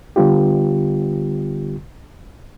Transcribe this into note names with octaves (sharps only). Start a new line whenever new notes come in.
D3 G3 B3 F4 G4